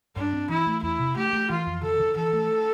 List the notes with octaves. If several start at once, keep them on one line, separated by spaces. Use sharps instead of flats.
G2 D4
C4
E3 E4
A3
E2 E4
C3
A3 G4
A3
E3 F4
F2
D3 A4
D3
E3 A4
A3